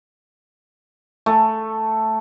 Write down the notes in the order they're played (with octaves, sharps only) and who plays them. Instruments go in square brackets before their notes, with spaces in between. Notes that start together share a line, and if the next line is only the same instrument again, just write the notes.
[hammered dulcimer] A3